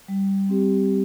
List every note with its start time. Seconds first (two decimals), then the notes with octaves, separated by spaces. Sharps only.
0.08 G3
0.49 C4 G4